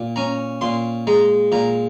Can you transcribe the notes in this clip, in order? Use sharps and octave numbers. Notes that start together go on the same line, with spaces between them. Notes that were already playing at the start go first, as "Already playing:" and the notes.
Already playing: A#2
C#4 A#5
A#2 C6
G#3 A#5
A#2 A#5